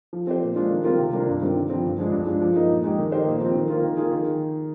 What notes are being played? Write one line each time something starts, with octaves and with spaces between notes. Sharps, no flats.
F3
C4 G4 C5
A#2
G#3 D4 F4
D#3
G3 C4 F4 A#4
C3
G3 A#3 D4 F4
G2
D#3 G3 C4 F4
D3
F3 C4
G2
F3 G#3 D4
G2
F3 G#3 D4
F3
A#3 D#4
A#2
G#3 D#4 G4
D#3
A#3 D#4 G4 C5
A#2
F3 C4
D#3
A#3 F4
D#3
A#3 F4 G#4
D#3